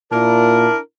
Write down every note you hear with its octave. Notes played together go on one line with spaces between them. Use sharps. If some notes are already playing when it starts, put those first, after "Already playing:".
A#2 D4 E4 A#4